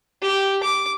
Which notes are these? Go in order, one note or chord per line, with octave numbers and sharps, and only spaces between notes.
G4
D6